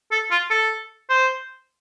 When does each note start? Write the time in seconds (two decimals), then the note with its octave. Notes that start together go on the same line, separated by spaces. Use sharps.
0.11 A4
0.31 F4
0.50 A4
1.09 C5